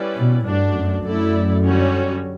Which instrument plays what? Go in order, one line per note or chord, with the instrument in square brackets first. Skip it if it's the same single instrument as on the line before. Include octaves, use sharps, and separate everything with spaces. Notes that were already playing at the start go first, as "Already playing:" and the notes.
Already playing: [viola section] G3 C#4 E4 B4 D5
[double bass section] B2
[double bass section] G2 [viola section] A3 D4 F#4
[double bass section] F#2
[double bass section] F#2 [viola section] A3 E4 A4 D5
[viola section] D3 G3 C#4 F#4 C#5